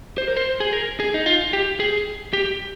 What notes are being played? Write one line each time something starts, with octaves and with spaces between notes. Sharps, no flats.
C5
A#4
C5
G#4
A#4
G#4
D#4
F4
G4
G#4
G4